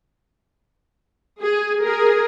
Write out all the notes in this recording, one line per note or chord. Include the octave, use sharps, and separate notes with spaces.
G#4
G#4 A#4